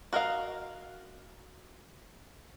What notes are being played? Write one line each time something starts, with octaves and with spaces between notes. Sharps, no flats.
F#4 A#4 D#5 F5